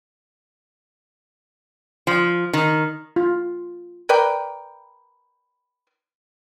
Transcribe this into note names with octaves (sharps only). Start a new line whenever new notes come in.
F3
D#3
F4
A#4 B4 D5 G5